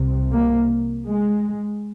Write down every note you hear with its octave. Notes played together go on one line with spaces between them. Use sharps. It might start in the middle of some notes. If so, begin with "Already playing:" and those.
Already playing: C2 C3
A#3
G#3